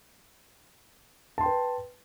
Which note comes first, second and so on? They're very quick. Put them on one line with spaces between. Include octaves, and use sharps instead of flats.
A5 C6 G5 B4